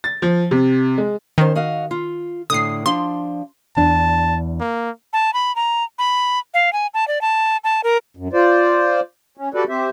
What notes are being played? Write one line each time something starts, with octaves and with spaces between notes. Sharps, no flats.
A6
F3
C3
G#3
D#3 C#4 C5
F#4 D#5 F5
F4
A2 D3 D#6 C7
F3 D4 C6
E2 D4 A5
A#3
A5
B5
A#5
B5
F5
G#5
A5
D5
A5
A5
A#4
F#2
F4 C5 D5
C#4
F#4 G4 A4 B4 D5
C4 G4 C5 E5